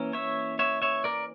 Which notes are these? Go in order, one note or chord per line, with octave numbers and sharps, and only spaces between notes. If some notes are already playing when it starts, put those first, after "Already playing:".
Already playing: E3 A#3 C#4
C#5 E5
C#5 E5
C#5 E5
A#4 D5